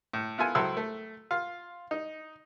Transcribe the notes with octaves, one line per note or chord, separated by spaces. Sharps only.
A2
B3 E4 F4 A4 G#5
C#2 F#3 E4 A4 C5 E6
A3
F4 F5
D#4